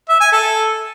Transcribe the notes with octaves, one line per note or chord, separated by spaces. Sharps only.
E5
G#5
A4